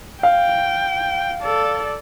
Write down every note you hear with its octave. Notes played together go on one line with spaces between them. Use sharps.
F5 G5
A4 D5